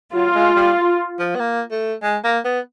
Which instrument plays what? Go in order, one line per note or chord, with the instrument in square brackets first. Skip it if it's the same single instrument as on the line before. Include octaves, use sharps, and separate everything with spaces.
[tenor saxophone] F#3 [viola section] F4
[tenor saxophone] G#3
G3
F3
B3
A#3
A3
G#3
A#3
B3